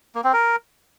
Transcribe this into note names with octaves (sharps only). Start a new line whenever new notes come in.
A#3
C4
A#4